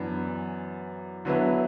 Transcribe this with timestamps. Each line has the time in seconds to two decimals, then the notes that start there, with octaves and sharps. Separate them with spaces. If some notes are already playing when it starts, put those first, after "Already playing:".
Already playing: F#2 E3 B3 D4
1.25 D3 F#3 B3 E4 B4